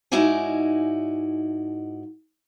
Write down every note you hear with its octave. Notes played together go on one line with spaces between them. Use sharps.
G#2 D#4 E4 F#4 D5 G#5